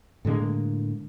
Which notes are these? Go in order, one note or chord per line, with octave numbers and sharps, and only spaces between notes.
A2 D3 G#3 A#3